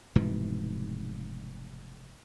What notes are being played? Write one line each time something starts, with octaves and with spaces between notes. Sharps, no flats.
F1 G#2 B2 E3